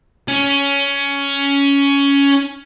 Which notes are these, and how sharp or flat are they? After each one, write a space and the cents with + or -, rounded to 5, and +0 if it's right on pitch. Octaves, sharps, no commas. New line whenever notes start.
C#4 +15